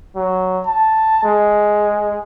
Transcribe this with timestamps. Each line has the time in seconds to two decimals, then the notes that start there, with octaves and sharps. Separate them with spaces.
0.16 F#3
0.66 A5
1.24 G#3